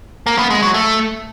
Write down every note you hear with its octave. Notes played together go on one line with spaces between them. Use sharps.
A#3
B3
G#3
F#3
A3